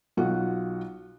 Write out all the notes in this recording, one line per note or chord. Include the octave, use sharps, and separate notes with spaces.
B1 F4 F#4 F#5